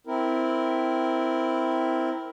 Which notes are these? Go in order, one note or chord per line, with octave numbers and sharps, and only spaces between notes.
C4 E4 A#4